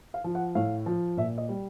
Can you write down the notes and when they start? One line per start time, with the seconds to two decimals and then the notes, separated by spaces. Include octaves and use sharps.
0.14 F5
0.24 F3
0.35 F#5
0.55 A2 F5
0.86 F3
1.17 A#2 E5
1.38 D#5
1.49 G3